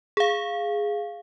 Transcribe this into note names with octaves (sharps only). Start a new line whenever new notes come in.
G#4 F5